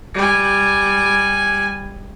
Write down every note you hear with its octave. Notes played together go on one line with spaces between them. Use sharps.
G3 G#5